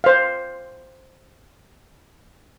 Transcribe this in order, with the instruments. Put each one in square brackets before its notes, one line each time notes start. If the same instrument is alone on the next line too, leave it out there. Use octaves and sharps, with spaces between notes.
[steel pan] C5 F5